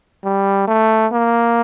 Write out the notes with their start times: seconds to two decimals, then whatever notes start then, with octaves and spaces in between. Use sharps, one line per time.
0.24 G3
0.67 A3
1.12 A#3